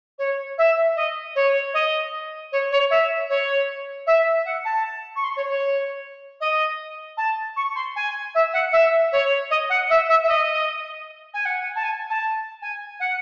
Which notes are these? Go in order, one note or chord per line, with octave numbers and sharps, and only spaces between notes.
C#5
E5
D#5
C#5
D#5
C#5
C#5
E5
C#5
E5
F#5
A5
C#6
C6
C#5
C#5
D#5
A5
C#6
C6
G#5
E5
F#5
E5
C#5
D#5
F#5
E5
E5
E5
D#5
G#5
F#5
A5
G#5
A5
G#5
F#5